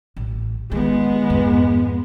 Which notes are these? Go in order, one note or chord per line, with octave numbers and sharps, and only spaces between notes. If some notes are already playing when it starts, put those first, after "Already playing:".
A1
D#3 G#3 B3
F2 G#2